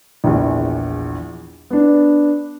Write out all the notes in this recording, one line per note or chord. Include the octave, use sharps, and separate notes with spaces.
A#1 E2
B3 D4